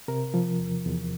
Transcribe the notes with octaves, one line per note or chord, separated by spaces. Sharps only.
C3 A#4
F3
E2
E2